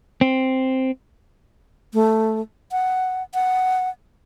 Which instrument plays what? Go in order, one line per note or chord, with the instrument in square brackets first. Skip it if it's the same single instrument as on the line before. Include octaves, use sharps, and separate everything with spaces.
[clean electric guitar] C4
[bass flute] A3
F#5
F#5